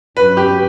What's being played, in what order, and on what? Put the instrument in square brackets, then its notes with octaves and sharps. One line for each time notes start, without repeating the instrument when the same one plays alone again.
[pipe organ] G2 F#3 C#4 F#4 [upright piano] B4
[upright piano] G4